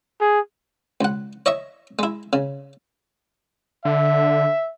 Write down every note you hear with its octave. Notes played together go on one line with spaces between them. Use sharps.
G#4
C#2 F#5
C#5 D#5 E5 C#6
G#3 E4
C#3
D3 E5